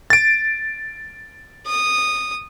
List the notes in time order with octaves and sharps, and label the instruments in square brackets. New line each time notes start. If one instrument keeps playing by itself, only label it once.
[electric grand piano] A6 D7
[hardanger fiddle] D#6